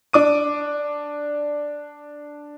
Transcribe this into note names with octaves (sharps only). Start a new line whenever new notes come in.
D4 D6 D#7